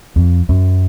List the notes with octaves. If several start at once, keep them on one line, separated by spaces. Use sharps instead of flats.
F2
F#2